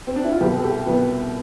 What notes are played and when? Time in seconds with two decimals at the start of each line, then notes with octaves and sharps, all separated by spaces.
0.07 C4
0.16 D4
0.24 E4
0.32 F4
0.41 C2 B2 G4
0.58 A4
0.64 G4
0.87 C2 B2 B3